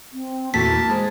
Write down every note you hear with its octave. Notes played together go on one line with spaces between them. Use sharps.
C4
E2 A#2 A3 F#4 A5 B6
A#3 E4
G#3 C5